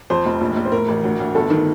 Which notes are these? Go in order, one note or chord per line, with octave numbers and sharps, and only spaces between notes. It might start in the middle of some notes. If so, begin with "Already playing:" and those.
F2 C5
F1
A#1
A#1
C5
A2 A#4
A1
D2
D2
G1 A4
D#3